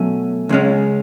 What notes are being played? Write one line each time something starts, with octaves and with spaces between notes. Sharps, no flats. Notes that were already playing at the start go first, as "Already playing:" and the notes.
Already playing: B2 F#3 A3 C#4
C#2 C#3 G#3 C#4